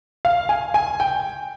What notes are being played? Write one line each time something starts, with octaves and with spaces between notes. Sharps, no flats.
F5
G#5
G#5
G5